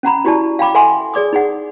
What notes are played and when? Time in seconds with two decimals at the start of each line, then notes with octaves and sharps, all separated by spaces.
0.03 C#4 F#5 A#5 B5
0.25 E4 F#4 G4 D5 A5
0.59 F5 G5 B5 D6
0.75 A4 E5 F#5 G#5 C6
1.14 G#4 D5 D6 D#6
1.33 D#4 G#4 F#5